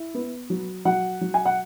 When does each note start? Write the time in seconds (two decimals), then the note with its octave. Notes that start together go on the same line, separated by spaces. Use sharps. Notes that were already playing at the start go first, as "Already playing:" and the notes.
Already playing: E4
0.14 B3
0.50 F#3
0.85 F#3 F#5
1.21 F#3
1.34 G#5
1.45 F#5